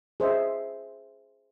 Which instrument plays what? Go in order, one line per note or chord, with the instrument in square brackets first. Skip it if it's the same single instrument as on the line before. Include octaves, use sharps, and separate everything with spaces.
[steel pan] G#4 C5 D#5 E5